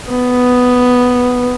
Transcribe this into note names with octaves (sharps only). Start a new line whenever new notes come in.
B3